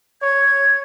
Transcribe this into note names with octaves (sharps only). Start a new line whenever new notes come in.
C#5 G#6